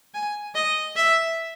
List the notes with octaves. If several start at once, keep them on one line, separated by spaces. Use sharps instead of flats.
G#5
D#5
E5